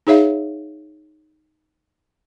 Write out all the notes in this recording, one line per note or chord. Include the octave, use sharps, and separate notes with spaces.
D#4 G#4 C#5 E5 F5